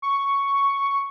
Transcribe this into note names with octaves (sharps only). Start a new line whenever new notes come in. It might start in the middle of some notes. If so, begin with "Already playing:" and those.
C#6